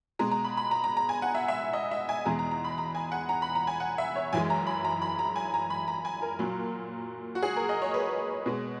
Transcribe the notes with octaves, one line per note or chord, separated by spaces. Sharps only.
B2 G#3 A#5
A#5
B5
B5
A#5
A#5
A#5
G#5
F#5
E5
E5
D#5
E5
G#5
E2 B2 G#3 A#5
A#5
A#5
B5
A#5
G#5
F#5
A#5
B5
A#5
G#5
F#5
E5
C#5
F#2 E3 G#3 G#5
A#5
B5
A#5
B5
A#5
G#5
A#5
B5
A#5
G#5
A#4
A#2 F#3
F#4
G#4
A#4
D#5
C#5
B4
B2 G#3